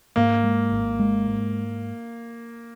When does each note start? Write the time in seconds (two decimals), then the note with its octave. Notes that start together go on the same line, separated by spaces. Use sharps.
0.16 G#2 A#3
0.43 G#3
0.72 G#1
0.99 G#3
1.27 G#2